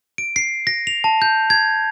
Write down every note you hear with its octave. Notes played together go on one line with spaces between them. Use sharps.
D7
C7
A#6
F7
A5
G6
G#6